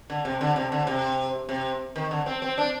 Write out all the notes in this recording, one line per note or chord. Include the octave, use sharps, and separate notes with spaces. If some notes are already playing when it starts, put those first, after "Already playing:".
D3
C3
D3
C3
D3
C3
C3
D#3
D3
C4
C4
D4